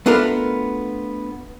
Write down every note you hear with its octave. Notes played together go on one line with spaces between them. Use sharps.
A3 B3 D4 F4 A4 A#4